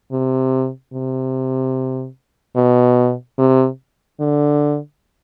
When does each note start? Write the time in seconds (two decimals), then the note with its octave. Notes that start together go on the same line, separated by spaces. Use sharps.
0.12 C3
0.93 C3
2.56 B2
3.38 C3
4.20 D3